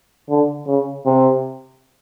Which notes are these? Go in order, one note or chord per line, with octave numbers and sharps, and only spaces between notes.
D3
C#3
C3